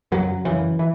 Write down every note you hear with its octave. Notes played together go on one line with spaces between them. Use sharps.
F#2 C#3 F#3
F#2 C#3 E3
E3